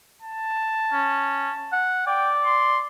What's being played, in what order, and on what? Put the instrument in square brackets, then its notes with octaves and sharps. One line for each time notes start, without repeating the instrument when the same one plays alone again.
[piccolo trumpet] A5
[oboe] C#4
F#5
[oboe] D5 [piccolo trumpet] G5
[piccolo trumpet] C6